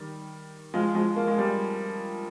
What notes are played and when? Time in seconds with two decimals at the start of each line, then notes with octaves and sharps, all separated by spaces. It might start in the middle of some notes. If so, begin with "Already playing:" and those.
Already playing: D#3 G3
0.74 F3 G#3
0.95 F3 G#3
1.16 A#3
1.27 G#3
1.38 G3 A#3